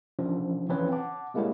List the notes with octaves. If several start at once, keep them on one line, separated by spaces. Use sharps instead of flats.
C3 E3 F3 C#4 D4
E3 F3 C4 C#4 B4 C#5
F#5 A5 D6
G3 G#3 A#3 E4 G4 C#5